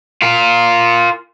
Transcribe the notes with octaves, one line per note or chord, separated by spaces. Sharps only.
F4 A#4